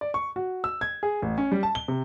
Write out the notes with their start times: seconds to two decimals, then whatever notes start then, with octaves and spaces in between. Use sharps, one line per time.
0.01 D5
0.14 C#6
0.36 F#4
0.64 E6
0.81 G#6
1.03 G#4
1.22 A1
1.38 C#4
1.52 G3
1.63 A5
1.75 G7
1.88 C3